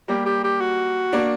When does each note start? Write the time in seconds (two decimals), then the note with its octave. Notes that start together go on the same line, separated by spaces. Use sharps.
0.08 G3 A#3 G4
0.26 G4
0.44 G4
0.61 F#4
1.12 A#3 D4